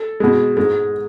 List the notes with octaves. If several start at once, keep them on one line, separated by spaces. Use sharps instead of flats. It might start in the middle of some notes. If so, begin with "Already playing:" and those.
Already playing: A4
B2 G#3
G#2 G#3